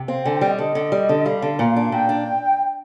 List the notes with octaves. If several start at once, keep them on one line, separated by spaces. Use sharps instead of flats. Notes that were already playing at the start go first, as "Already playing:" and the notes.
Already playing: C3
C4 F5
D3 G#5
G5
G3
D#5
D3 D#5
D3
G3
D3
G3 F5
D3
A#2
D4
A#2 G5
D4